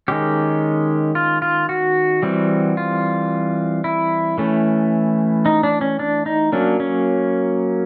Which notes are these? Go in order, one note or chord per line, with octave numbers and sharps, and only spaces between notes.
D#3 G#3 C#4 G4
F4
F4
F#4
E3 G3 C4
F4
E4
E3 A3 C#4
D#4
D4
C#4
D4
D#4
F#3 A#3 C#4 D4
C#4